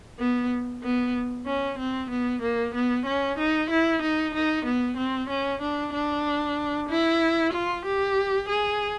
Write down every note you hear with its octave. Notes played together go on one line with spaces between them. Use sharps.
B3
B3
C#4
C4
B3
A#3
B3
C#4
D#4
E4
D#4
D#4
B3
C4
C#4
D4
D4
E4
F4
G4
G#4